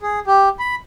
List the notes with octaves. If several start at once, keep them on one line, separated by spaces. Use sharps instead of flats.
G#4
G4
B5